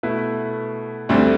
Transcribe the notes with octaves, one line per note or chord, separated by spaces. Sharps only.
B2 A3 E4 B4
D2 D3 G3 C4